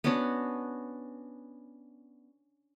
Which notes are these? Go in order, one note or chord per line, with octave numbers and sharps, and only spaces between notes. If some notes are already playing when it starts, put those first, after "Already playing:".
B3 C#4 D4 F#4